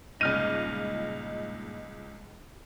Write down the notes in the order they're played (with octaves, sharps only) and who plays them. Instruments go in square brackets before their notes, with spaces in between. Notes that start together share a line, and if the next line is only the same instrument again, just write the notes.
[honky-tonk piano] C#2 F6 D#7 [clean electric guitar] G2 A#2 D#4